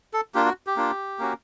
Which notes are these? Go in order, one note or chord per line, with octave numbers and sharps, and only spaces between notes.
A4
A#3 D4 F4 G4
F#4
G4
A#3 D4 F4
A#3 C#4 F#4